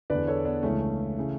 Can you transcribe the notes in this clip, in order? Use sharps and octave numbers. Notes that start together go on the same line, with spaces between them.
E2 D3 B4 D5
A4 C#5
B3 D4
C#2 C#3 E3 A3 C#4
C#3 E3